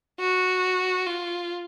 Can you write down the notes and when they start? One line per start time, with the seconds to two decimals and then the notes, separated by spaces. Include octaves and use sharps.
0.20 F#4
1.07 F4